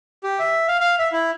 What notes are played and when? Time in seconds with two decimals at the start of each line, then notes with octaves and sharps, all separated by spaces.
0.24 G4
0.39 E5
0.68 F5
0.81 F5
0.99 E5
1.13 E4